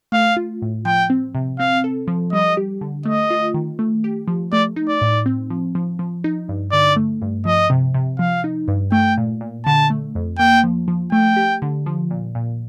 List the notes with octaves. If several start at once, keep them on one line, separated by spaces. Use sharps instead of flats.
A3 F5
F4
A2
F3 G5
C4
C3
C4 F5
A4
F3
G3 D#5
G4
D3
A3 D#5
F4
D#3
A3
G4
F3
A3 D5
D#4
D5
A2
C4
F3
F3
F3
D#4
G2
D3 D5
A3
G2
F3 D#5
C3
C3
F3 F5
D#4
G2
A3 G5
A#2
A#2
D3 A5
A3
F2
A#3 G5
F3
F3
A3 G5
G4
D3
F3
A#2
A#2